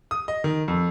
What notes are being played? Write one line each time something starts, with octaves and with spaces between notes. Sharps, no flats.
D#6
D#5
D#3
F2